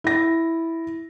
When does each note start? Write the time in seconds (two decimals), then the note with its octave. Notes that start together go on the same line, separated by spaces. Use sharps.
0.04 E4 A#6